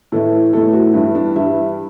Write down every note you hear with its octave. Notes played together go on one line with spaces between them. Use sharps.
A2 E3 A3 A4
A2 E3 A3 A4
F#4
G2 E3 G3 E4
D4
G2 E3 G3 E4